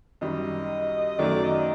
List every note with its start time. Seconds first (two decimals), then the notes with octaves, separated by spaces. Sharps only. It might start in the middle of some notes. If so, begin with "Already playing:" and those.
0.21 F#2 D#3 G3 D#5
1.19 F#2 D#3 F#3 A3 D5
1.43 D#5